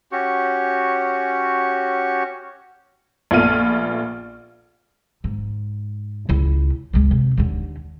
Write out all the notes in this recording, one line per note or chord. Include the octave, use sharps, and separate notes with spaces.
C#4 F#4 G4 C#6
A#1 A3 B3 F4 F6 D#7
G#2
C#2 E4
C#2 G#3
C3
D#2 D3